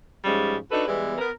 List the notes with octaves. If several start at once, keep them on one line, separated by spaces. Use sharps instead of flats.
G#2 F3 G3 G#3 C#4
D4 D#4 F#4 A4 B4
E3 G3 G#3 B3
B3 A#4